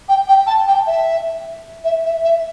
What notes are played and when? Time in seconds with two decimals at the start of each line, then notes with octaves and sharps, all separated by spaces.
0.09 G5
0.28 G5
0.47 A5
0.68 G5
0.87 E5
1.84 E5
2.05 E5
2.24 E5